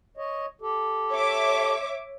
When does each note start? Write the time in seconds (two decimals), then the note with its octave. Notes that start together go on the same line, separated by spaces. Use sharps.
0.17 C#5 D#5
0.62 G4 A4
1.11 C#5 E5 D6